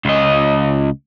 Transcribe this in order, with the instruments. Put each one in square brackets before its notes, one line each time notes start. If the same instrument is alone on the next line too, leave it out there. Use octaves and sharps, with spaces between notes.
[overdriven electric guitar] C#2 D#5